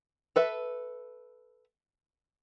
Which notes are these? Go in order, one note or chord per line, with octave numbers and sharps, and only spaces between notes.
A4 B4 E5